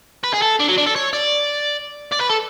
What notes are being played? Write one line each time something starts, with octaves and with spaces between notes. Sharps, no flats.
B4
G#4
A4
D4
F#3
D4
A4
C#5
D5
D5
B4
A4